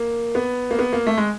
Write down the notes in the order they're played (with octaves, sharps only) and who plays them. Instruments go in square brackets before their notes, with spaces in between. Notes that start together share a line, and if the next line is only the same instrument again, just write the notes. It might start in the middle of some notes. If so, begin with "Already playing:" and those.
Already playing: [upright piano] A#3
B3
A#3
B3
A#3
A3
G#3